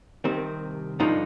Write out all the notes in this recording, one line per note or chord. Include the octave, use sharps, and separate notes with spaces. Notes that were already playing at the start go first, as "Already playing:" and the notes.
C2 C3 D#3 C4
G2 D3 F3 D#4